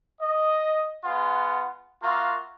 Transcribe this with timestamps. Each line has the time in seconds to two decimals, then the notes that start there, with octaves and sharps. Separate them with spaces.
0.21 D#5
1.04 G#3 B3 F4 F#5
2.03 A#3 F4 F#4 E5 C6